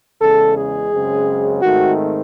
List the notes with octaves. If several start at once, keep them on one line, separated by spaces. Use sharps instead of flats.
E2 C#3 G#3 A4
G#4
F#2 C#3 G#3 C4
G#2 D#3 A3 C4 F#4